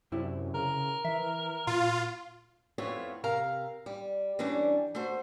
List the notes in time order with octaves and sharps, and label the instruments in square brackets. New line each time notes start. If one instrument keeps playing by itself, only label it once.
[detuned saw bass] F#2 [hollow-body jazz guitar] C3 E4
[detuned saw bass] C#3 [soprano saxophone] A#4
[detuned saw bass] E3 [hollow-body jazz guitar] E5
[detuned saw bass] A#2 [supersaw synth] F4
[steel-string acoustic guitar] F2 A3 B3 E4 F4 C#5
C3 A#4 F5 A#5
G3
E3 G3 C#4 D4
A3 F#4 C5